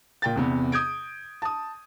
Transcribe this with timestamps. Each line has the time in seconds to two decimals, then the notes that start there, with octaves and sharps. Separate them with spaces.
0.22 A#2 G5 A6
0.36 E2 C3 B3
0.72 D#6 G6 G#6 D7
1.42 A5 D#6